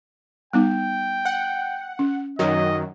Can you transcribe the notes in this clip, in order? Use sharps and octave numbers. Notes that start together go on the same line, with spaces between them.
G3 B3 D#4 G5
F#5
C#4
F#2 D#3 F#3 D#5